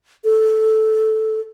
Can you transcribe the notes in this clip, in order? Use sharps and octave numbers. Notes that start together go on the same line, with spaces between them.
A4